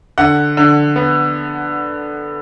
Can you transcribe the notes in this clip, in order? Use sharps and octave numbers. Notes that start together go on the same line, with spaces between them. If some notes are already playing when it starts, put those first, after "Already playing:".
D3 F#5
D3
B3